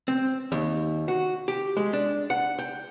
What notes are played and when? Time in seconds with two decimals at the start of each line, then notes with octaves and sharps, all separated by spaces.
0.08 C4
0.52 D#2
1.08 F#4
1.48 G4
1.77 G#3
1.93 D4
2.30 F#5
2.59 G5